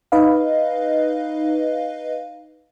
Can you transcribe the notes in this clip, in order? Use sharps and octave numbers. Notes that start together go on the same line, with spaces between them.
D#4 B4 D#5 F5